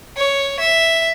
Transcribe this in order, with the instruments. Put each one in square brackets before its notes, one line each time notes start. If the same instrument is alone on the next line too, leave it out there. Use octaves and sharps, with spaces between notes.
[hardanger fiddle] C#5
E5